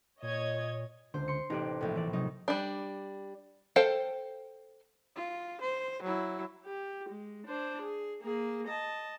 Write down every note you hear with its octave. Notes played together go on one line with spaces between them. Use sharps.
A#2 C#5 D#5 G#6
C#2 D3 C5
C6 C#7
A1 C3 D#4 G4 D5
A#1 A2
E3 D5
C3 F#3 D#4
G3 D4
A4 C5 F5 G5
F4
C5
F#3 E4
G4
G#3
D4 C5
G#4
A#3 G#4
D#5 A5